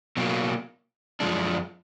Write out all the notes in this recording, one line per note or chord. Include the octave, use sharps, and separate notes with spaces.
B2 F#3 A#3
F#2 F3 G#3 D4